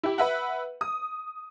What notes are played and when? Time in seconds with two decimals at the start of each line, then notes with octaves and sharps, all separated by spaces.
0.03 E4 G4
0.18 B4 E5 F#5
0.81 D#6